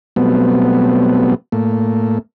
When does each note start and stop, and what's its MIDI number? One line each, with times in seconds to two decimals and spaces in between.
0.16 1.34 47
0.16 1.34 54
0.16 1.34 55
0.16 1.34 57
0.16 1.34 59
0.16 1.34 60
1.52 2.18 45
1.52 2.18 57
1.52 2.18 58